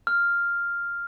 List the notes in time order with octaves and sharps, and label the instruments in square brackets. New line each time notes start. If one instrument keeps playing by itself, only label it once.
[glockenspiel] F6